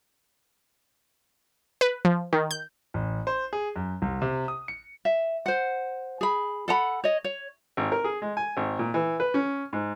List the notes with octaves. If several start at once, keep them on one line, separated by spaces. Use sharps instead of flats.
B4
F3
D#3
G6
A1
C5
G#4
F#2
C2
C3
D#6
C#7
E5
C5 F#5
G#4 B5
A4 F#5 A#5 B5
C#5 D#5
C#5
G#1
A#4
G#4
G#3
G#5
G#1
A#2
E3
B4
C#4
G#2